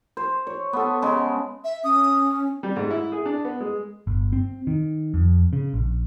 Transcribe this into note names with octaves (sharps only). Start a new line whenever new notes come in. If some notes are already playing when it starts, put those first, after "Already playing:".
C5
C#5
B3 A4
C#3 G#3
E5
C#4 D#6
G3
G#2
E4
G#4
D4
B3
G#3
G1
C4
D#3
F2
C#3
A#1